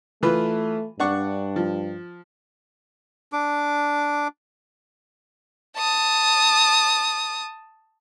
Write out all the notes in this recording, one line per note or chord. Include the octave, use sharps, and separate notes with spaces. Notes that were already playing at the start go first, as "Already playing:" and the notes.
E3 A3 F4 B4
G2 D4 F#5 C#6
F3
D4 D6
A5 D#6